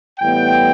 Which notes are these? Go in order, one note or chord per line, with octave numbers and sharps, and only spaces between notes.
A2 E3 G3 B3 G5